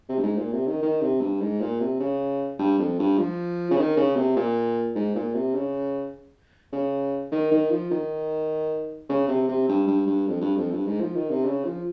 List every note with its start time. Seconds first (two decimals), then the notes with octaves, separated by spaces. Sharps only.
0.09 C3
0.19 G2
0.23 G#2
0.37 A#2
0.53 C3
0.67 D#3
0.82 D#3
1.02 C3
1.21 G2
1.41 G#2
1.61 A#2
1.80 C3
2.00 C#3
2.59 G2
2.79 F2
2.99 G2
3.18 F3
3.71 C#3
3.78 D#3
3.97 C#3
4.16 C3
4.36 A#2
4.95 G#2
5.15 A#2
5.35 C3
5.55 C#3
6.73 C#3
7.32 D#3
7.51 D#3
7.71 F3
7.91 D#3
9.09 C#3
9.28 C3
9.49 C3
9.69 G2
9.88 G2
10.07 G2
10.27 F2
10.42 G2
10.57 F2
10.72 G2
10.87 G#2
11.01 F3
11.16 D#3
11.30 C3
11.45 C#3
11.65 F3